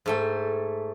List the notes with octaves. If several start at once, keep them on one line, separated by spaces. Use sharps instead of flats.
G#2 A3 G5